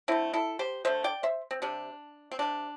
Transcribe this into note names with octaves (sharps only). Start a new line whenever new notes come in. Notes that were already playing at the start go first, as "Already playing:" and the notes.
D3 A3 C4 E4
E4 A4
G4 C5
D3 A3 C5 E5
D5 G5
C5 E5
C4
C3 G3 D4
C4
C3 G3 D4